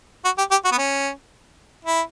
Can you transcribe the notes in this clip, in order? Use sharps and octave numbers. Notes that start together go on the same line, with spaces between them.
F#4
G4
G4
F#4
B3
C#4
E4